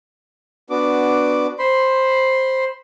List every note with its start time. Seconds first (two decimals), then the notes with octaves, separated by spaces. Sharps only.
0.70 B3 D4 F#4 D6
1.59 C5 B5 C6